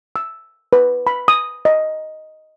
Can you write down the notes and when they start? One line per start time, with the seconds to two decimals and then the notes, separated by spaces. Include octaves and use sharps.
0.16 E6
0.73 B4
1.07 B5
1.28 D#6
1.65 D#5